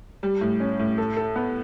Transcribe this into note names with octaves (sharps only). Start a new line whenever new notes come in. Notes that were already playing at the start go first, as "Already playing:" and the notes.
G3
A2
C#4
A2
A4
A4
B3